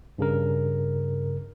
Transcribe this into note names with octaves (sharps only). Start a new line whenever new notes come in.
G2 C#3 A#4